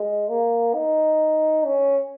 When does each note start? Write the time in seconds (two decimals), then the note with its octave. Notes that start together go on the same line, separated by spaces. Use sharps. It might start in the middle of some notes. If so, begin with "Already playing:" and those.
Already playing: G#3
0.29 A#3
0.74 D#4
1.65 C#4